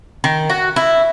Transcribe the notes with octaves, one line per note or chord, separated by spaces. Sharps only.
D#3
F#4
E4